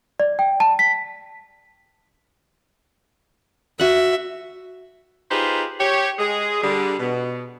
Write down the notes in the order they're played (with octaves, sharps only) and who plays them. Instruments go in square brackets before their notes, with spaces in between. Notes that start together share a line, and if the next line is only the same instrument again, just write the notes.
[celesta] D5
G5
A5
B6
[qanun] F#4 F#5 [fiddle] E5
[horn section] D#4 F4 G4 G#4 B4 C5
G4 C#5
G#3 G#4
D3 G3 G#4
B2